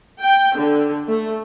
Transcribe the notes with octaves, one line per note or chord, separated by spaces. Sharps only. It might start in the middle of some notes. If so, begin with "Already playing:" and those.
G5
D3
A3